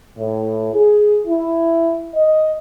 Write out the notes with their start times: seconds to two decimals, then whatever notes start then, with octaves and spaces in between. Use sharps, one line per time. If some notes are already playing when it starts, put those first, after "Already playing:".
0.17 A2
0.74 G#4
1.27 E4
2.16 D#5